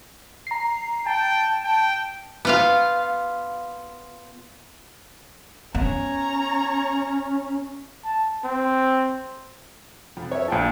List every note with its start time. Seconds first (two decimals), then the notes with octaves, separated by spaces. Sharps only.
0.47 A#5 C7
1.06 G5 A5
1.64 G5
2.45 B3 F4 F5
5.75 B3 C#4 C#5 A#5
8.05 A5
8.44 C4
10.17 F2
10.31 C#5 E5
10.48 A#1 F4 G#4 G5 A5